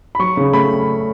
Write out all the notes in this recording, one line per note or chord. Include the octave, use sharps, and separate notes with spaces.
B5
F#3 C#6
C#3
A3 B5